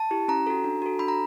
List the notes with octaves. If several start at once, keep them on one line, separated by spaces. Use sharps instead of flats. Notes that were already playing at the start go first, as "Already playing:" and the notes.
Already playing: A5
E4 G4
C#4 A#5
F#4 A4
D4
F#4 A4
D4 B5
A#5